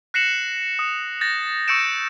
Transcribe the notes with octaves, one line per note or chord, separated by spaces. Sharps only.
F#6 A#6 C7 C#7 E7 F#7
D#6
G6 A6 A#6
C#6 E6 G6 C#7 D7 E7